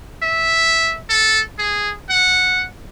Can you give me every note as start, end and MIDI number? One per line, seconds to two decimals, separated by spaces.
0.23 0.97 76
1.09 1.40 69
1.59 1.92 68
2.10 2.65 78